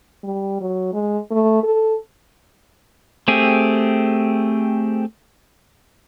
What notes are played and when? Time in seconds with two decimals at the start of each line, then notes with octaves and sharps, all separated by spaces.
0.23 G3
0.61 F#3
0.93 G#3
1.31 A3
1.63 A4
3.28 A3 C4 G4 G#4